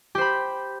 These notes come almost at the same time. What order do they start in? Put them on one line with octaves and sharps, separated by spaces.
G4 C5 B5